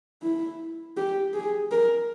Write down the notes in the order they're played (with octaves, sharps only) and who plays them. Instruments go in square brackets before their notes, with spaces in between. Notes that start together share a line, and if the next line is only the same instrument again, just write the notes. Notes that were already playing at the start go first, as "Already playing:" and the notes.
[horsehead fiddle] E4
G4
G#4
A#4